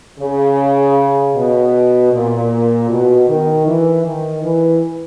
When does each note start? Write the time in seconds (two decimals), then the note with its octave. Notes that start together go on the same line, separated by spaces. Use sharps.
0.20 C#3
1.35 B2
2.13 A#2
2.90 B2
3.28 D#3
3.67 E3
4.05 D#3
4.43 E3